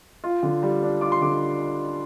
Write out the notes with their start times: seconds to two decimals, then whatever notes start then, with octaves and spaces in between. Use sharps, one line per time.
0.24 F4
0.43 D3
0.63 G3
0.82 D4
1.01 F4 D6
1.12 C6
1.21 D3 D6